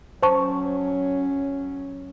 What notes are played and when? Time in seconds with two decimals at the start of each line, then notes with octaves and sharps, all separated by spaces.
0.23 F#3 C#4 C5 A5 C#6